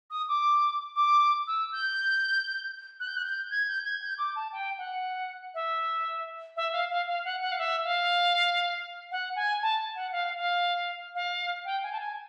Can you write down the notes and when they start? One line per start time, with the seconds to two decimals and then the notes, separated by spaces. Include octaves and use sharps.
0.10 D#6
0.29 D6
0.96 D6
1.47 E6
1.72 G6
3.00 F#6
3.08 G6
3.17 F#6
3.25 G6
3.51 G#6
3.68 G6
3.85 G#6
4.02 G6
4.18 D6
4.36 A5
4.52 G5
4.78 F#5
5.54 E5
6.57 E5
6.73 F5
6.90 F5
7.07 F5
7.25 F#5
7.42 F#5
7.52 F5
7.58 E5
7.84 F5
9.12 F#5
9.36 G#5
9.62 A5
9.96 F#5
10.12 F5
10.38 F5
11.15 F5
11.65 G5
11.83 G#5
11.92 A5
12.00 G#5